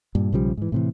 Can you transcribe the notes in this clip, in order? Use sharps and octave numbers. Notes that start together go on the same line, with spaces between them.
G2 A#2
B1 C#3 F3 G3
G#2 E3
A2 C3 E3